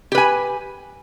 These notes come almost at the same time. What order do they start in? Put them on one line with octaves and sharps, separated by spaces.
G4 B4 G#5